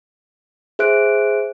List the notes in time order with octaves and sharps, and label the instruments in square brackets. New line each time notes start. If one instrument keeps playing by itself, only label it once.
[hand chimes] G#4 C5 E5 F#6 D7